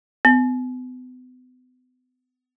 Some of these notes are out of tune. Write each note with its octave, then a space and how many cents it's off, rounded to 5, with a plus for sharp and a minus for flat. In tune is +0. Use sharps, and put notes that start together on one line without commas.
B3 +40